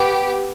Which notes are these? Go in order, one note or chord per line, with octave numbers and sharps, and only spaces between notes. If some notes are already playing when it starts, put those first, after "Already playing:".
Already playing: B3 G4